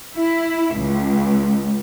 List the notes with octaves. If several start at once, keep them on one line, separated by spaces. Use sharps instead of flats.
E4
C#2